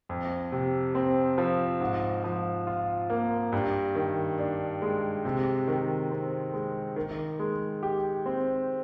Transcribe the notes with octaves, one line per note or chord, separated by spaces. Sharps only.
F2
C3
C4
F3
G#2
F3
F4
A#3
G2
D#3
D4
G#3
C3
D#3
C4
G#3
D#3
G#3
G4
C4